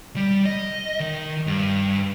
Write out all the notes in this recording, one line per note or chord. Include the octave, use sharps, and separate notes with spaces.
G3
D#5
D#3
G2